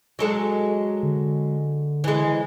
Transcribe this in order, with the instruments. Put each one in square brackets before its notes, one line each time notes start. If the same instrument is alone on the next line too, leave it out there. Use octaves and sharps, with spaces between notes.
[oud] F#3 G#3 A4
[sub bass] D3
[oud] E3 G#3